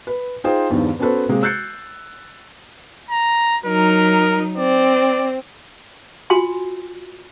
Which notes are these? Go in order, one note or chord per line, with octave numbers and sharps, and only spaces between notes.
B4
D#4 F4 G#4 C5 G5 D#6
E2 G2 D#3 F3
B3 C#4 F#4 A4 B4 C5
C3 G#3 A#3
E6 F#6 G6 A6 C7 C#7
A#5
F#3 D#4 A#4
C4 D5
F4 F#4 G#5 C6